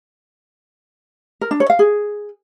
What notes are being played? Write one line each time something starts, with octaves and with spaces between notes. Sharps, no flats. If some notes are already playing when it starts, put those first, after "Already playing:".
A#4
D4
C#5
F5
G#4